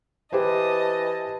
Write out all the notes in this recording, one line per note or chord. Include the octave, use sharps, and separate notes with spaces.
E3 G4 C5 D#5 A5